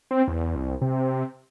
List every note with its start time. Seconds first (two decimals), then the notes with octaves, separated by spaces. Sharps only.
0.11 C4
0.28 E2
0.55 C2
0.81 C3